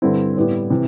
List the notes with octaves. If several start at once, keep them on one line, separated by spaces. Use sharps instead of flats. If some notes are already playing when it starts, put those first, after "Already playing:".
G2 D3 G3 C4 E4
A2 G3 B3 E4 G4
C3 E3